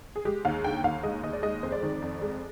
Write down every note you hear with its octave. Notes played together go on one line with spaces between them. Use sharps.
G#4
G#3 G4
D#2 F5
D3 G5
D#2 F5
G#3 D#5
D#2 D#5
D5
G#3 D#5
F2 C5
D5
D#3
F2
G#3